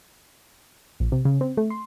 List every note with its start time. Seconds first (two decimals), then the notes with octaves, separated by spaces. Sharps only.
1.00 A#1
1.12 C3
1.25 C#3
1.41 C4
1.57 A3
1.70 C6